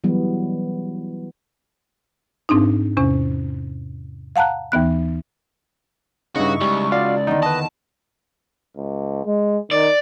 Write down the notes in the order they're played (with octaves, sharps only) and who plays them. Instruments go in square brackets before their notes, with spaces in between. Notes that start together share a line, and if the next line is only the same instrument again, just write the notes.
[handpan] E3 F#3 G3 B3
[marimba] G#2 C4 D4 D#4
E2 C3 C#4
F5 F#5 A5 A#5 F#6
D#2 E3 B3 F#6
[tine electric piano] G2 C#3 [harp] D#4 E4 [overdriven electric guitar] F#4 [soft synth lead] C#6
[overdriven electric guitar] C#2 [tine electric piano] G3
[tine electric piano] F4 F#4 F5 [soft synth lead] D5
[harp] E2 D3 D#3 [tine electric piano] D#4
[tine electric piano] B4 D#5 [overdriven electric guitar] A5
[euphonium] C#2
G#3
[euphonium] D#3 [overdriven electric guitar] D5